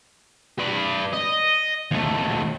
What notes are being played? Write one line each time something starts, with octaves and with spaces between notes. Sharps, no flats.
B4 D5
D#5
D#2 A3